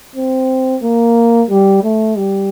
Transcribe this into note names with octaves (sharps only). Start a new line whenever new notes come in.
C4
A#3
G3
A3
G3